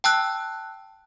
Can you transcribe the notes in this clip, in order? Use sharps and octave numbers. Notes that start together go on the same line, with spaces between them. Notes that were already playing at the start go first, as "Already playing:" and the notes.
G5 A5 E6 F#6